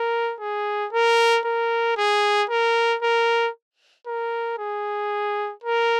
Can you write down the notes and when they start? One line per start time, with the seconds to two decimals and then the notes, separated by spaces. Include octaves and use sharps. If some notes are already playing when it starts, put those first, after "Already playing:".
Already playing: A#4
0.40 G#4
0.93 A#4
1.45 A#4
1.97 G#4
2.50 A#4
3.03 A#4
4.07 A#4
4.59 G#4
5.64 A#4